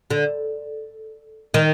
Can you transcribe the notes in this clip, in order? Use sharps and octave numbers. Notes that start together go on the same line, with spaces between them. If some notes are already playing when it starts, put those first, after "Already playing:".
D3
D#3